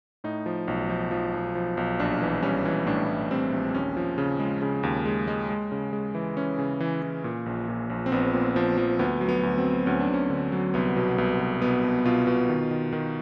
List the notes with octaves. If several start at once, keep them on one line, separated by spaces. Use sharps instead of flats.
A2 D#4
F3
B1
F3
F3
B1
F3
B1
A#1 D4
E3
G3 C#4
E3
A2 D4
A2
G3 C4
A#1
D#2 C#4
F3
C#3
G#3
C#3
D#2
G#3
G#3
G#3
C#3
G#3
E3
E3 C#4
C#3
E3
E3
A#2
A#1
A#2
A#1
C4
A#1 B3
A#2
F3
F3
D2 B3
F#3
B3
D2
C4
F#3
D2 C#4
D4
D2 C#4
D3
F#3
C2 B3
B2
C2 B3
B2
B2 B3
B2
B2 F4
B2
D#3
D#3
D#3